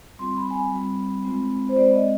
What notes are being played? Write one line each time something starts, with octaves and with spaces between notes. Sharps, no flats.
G3 C4 F4 C6
B5
G#5
B5
G3 C4 F4
G#3 C4 F4
C5
G#3 C4 F4 D5
D#5